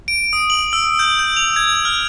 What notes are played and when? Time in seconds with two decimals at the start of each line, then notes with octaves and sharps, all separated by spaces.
0.08 D7
0.33 D#6
0.50 F#7
0.73 E6
0.99 G6
1.19 G6
1.37 F7
1.56 G#6
1.85 F6